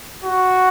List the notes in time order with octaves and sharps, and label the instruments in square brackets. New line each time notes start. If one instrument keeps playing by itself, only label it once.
[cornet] F#4